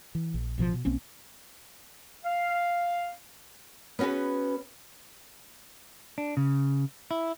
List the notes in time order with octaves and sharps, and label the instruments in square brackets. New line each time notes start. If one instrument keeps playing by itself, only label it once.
[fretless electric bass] E3
A#1
A1 B2 E3 F3
B2
B1 A#3 C4 C#4
[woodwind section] F5
[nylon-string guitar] B3 C#4 F#4 G#4 B4
[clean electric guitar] D4
C#3
E4